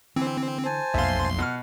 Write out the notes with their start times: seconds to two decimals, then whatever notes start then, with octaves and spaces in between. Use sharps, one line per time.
0.16 D3 E3 C4
0.65 C5 G#5 A5
0.94 B1 F2 A#3 E5 F5 C6
1.38 B2 F#5 F6